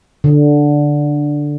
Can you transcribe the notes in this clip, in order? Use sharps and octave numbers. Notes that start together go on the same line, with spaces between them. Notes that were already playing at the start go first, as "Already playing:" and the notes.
D3